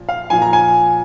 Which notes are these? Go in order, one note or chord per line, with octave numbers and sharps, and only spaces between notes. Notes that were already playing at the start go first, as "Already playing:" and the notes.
Already playing: A#2 F3
F5
A#2 F3 G#5
A#5
G#5